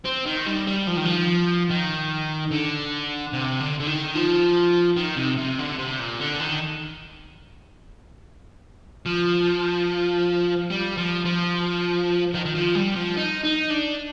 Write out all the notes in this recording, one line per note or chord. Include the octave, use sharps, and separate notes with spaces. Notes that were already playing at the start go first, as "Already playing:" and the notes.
C4
D#3
G3
G3
F3
D#3
F3
D#3
D3
C3
D3
D3
D#3
F3
D#3
C3
C3
D3
C3
A#2
D3
D#3
F3
G3
F3
F3
D#3
D#3
F3
G3
F3
D#4
D#4
D4